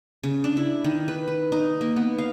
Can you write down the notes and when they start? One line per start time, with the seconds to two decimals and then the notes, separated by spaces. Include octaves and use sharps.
0.23 C#3
0.44 D4
0.57 E4
0.84 D#3
1.08 B4
1.28 B4
1.52 D#4
1.81 A#3
1.96 B3
2.18 F5